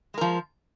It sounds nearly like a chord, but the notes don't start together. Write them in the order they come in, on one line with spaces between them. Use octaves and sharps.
G#3 A#4 F3